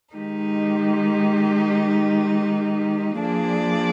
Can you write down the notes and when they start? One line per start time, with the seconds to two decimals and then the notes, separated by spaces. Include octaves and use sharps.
0.15 D#3 G#3 D#4 G4
3.18 F3 A#3 D4 G#4 D5